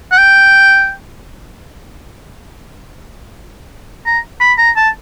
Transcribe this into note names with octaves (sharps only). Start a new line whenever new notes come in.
F#5
G5
A#5
B5
A#5
A5